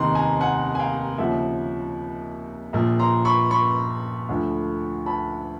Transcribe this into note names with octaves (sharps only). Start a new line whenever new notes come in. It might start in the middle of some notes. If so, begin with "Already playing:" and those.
Already playing: F1 D#2 D#3 A#5 C6
G#5 A#5
F#5 G#5
G#5
F5 G5
D#2 C#3 F3 E5 F#5
A#1 A#2 F3
A#5 C6
B5 C#6
B5 C#6
D2 D3 F3
A5 B5